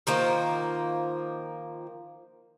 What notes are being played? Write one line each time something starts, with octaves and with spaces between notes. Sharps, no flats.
D#3 F3 A#3 C5